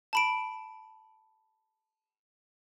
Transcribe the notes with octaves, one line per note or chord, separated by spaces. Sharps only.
A5 B5 D7